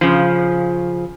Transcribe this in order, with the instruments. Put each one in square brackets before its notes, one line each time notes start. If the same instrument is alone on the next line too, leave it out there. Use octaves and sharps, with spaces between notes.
[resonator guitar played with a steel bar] C#3 F3